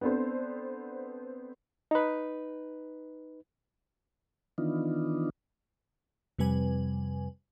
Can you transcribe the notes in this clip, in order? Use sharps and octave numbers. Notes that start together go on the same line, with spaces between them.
B3 C4 D4 A4 C5
D#4 B4
D#3 E3 B3 D4 D#4 F4
F2 C3 G3 B4 G#5